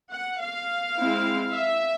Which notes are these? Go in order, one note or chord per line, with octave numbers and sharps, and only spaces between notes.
F#5
F5
G#3 C4 E4
E5